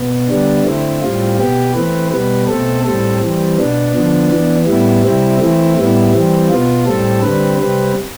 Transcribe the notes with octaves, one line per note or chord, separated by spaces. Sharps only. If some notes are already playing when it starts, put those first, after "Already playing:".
Already playing: B2 B3
D3 G3 B3 D4
D3 A3 C4 E4
A2 G3 C4 F4
B2 B3 G4
E3 A3 C4 B4
B2 G3 B3 B4
B2 A3 C4 A4
A2 G3 C4 A4
E3 G3 C4
B2 B3 D4
D3 F3 B3
E3 B3
A2 G3 B3 E4
C3 G3 C4 E4
E3 A3 C4 E4
A2 G3 B3 E4
E3 G3 C4
B2 B3 F4
A2 G3 C4 A4
D3 G3 C4 B4
C3 G3 C4 B4